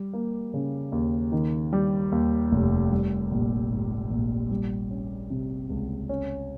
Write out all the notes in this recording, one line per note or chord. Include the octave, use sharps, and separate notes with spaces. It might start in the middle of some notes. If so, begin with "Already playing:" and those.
Already playing: G3
A#3
C#3
D#2
D#3
G3
D#2
F1
G3
A#1
G#2
A#1
G3
C#4
C3
C#2
C#4